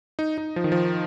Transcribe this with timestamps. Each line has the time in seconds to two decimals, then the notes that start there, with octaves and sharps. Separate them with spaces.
0.19 D#4
0.38 D#4
0.56 F3
0.64 D#3
0.72 F3